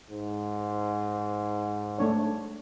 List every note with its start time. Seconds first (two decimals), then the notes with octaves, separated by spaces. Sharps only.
0.10 G#2
1.98 A3 D4 C#5